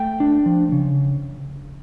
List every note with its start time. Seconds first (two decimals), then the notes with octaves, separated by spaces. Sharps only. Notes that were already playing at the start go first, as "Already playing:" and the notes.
Already playing: A3 G5
0.20 D4
0.46 F3
0.72 C#3